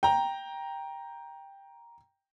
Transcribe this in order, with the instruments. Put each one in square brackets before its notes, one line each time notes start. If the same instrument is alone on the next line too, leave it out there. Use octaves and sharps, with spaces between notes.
[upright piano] G5 A#5